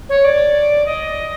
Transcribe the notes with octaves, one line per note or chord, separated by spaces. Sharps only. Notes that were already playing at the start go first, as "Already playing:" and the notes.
C#5
D5
D#5